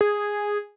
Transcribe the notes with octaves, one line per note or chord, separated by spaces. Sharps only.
G#4